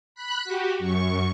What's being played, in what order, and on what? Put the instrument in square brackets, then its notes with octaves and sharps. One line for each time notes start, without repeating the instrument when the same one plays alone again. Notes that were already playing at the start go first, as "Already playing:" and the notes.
[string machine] B5 F#6
F#4 G4
F#2 C#6